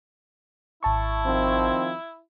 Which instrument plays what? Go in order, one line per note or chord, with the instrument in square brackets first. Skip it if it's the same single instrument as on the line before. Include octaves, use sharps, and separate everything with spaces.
[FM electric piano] G#1 A5 C#6 [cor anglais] E4
[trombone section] D#3 F3 C4